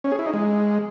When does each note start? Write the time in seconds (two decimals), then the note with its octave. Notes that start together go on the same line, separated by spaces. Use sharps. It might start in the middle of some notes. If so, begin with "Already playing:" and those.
0.04 C#4
0.12 G#4
0.19 E4
0.26 D#4
0.34 G#3